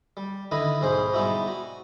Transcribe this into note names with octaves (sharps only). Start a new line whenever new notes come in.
G3
D3 D#3 E4 B4 D#5 B5
B1 G#2 G#4 C5 B5
G3 G#3 B3 D#4 E4 F#4
F#4